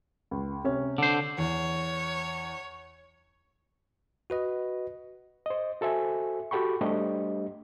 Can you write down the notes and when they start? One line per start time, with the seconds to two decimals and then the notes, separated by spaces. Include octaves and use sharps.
0.31 C#2
0.64 C3 C#4
0.98 D3 C5
1.38 E2 C#5
4.30 F#4 B4 D#5
5.46 C5 D#5
5.81 F#4 A4 C5 E5 G#5
6.51 F#4 G4 A4 G5 B5 C#6
6.81 G3 A3 D4 G4 C5 D#5